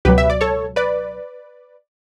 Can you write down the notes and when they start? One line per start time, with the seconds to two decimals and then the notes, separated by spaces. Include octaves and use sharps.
0.05 C#2 B2 F#3 G4 B4
0.18 E5
0.30 D5
0.41 A4 C#5
0.76 B4 D5